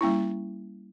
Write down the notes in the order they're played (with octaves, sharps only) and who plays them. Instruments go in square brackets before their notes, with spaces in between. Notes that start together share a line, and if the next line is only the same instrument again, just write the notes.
[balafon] G3 A#3 C#4 E4